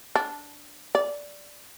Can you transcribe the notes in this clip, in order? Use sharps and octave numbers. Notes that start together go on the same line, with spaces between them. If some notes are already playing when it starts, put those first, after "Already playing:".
D4
D5